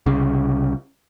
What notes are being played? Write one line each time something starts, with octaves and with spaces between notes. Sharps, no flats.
C2 C#3